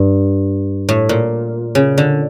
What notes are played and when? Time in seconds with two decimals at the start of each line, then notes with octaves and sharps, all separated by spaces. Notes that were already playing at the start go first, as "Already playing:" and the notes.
Already playing: G2
0.89 A2
1.09 A#2
1.75 C#3
1.98 D3